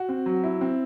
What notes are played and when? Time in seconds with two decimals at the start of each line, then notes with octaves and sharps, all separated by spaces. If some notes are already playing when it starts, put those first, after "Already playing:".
Already playing: F#4
0.09 C4
0.26 F#3
0.44 E4
0.61 C4